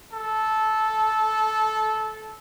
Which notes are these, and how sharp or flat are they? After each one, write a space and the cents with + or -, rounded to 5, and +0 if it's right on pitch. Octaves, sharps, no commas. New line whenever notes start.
A4 -15